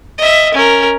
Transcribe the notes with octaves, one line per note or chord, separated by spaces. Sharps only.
D#5 E5
C#4 A#4